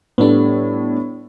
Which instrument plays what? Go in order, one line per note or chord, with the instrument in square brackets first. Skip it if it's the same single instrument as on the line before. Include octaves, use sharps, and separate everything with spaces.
[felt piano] A2 G3 A4 [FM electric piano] B3 D4